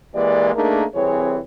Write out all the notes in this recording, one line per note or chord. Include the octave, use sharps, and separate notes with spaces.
E3 G#3 A#3 G4 D5
A3 A#3 D4 D#4 G#4 A#4
C2 E3 C4 G#4 C#5